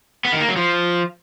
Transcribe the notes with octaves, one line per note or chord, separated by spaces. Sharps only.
B3
D#3
A#3
F#3
F3